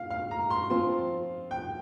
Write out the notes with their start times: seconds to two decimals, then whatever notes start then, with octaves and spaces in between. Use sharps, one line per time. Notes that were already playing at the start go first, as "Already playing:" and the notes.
Already playing: F5
0.10 F5
0.31 A#5
0.50 C6
0.70 F3 C4 F4 C6
1.51 G5